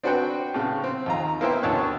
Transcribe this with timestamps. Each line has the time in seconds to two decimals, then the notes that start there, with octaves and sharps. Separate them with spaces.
0.03 C4 D4 F#4 B4 F#5 G5
0.54 A2 C#3
0.84 C4
1.06 D#2 F4 A#5
1.41 A#3 B3 E4 C5 E5 G5
1.63 D2 B2 C#4 A5 C#6 F#6